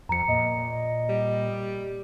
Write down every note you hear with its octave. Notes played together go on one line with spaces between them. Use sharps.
F2 A#5 C#7
A#2 D#5
G3